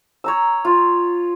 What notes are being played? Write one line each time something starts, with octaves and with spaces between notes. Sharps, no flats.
C#5 A#5 E6
F4